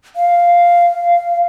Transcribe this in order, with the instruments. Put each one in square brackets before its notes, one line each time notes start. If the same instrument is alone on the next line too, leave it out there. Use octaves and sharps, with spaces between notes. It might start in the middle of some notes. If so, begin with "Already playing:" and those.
[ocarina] F5